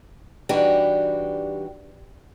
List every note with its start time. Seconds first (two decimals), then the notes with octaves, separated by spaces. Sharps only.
0.49 E3 G3 D4 D#4 F#4 G4